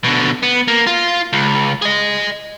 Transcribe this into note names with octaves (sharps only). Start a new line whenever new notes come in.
B2 D3
B3
A#3
F4
C#2
G#4 D#5